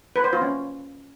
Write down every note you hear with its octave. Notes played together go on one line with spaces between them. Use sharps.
B4
C5
F4
C#4